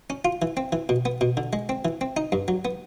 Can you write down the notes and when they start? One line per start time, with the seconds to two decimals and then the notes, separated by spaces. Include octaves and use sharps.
0.10 C#4
0.25 F4
0.42 E3
0.57 C4
0.72 E3
0.89 B2
1.05 B3
1.21 B2
1.37 D3
1.53 G#3
1.69 C4
1.85 E3
2.01 C4
2.17 D#4
2.32 G2
2.48 F#3
2.65 B3